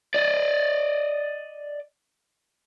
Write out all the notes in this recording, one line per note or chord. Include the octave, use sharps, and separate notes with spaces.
D5 D#5